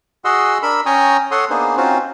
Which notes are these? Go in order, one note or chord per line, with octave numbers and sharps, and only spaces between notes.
F#4 G#4 D#5 F#5 C6 E6
D4 A#4 B5 E6
C#4 G5 G#5 A#5 C#6 D#6
A4 C#5 F#5 C6 D#6
A#3 B3 D4 D#4 G#4 C5
C4 C#4 D#4 F4 F#4 C5